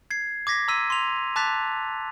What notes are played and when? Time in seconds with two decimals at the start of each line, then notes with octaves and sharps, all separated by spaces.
0.11 G#6 C7
0.47 D6 G#6 A#6 B6
0.68 A#5 C6 E6 B6 D#7
0.90 C6 F7
1.36 A5 D6 F#6 A6 B6 F7